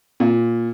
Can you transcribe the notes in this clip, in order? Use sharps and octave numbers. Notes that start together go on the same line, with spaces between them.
A#2